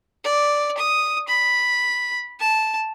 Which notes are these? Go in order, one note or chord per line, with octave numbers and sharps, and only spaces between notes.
D5
D#6
B5
A5